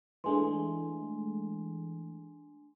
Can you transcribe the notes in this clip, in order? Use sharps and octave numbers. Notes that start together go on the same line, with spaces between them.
E3 G#3 A3 D4 G#5 C6